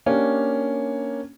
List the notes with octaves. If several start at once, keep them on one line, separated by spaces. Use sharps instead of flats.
A#3 C#4 D4 G4